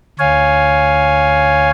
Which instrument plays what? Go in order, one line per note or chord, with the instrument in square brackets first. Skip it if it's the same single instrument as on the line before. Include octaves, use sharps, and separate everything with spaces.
[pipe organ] D2 C#5 F5 G#5